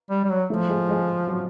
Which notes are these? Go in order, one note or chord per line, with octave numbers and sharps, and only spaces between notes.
G3
G3
F#3
F3 A3
G#3
G#3
F#3